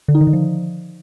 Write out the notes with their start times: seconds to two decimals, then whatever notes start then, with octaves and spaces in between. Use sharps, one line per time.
0.08 D3
0.15 D#4
0.21 D#3
0.27 D3
0.33 F3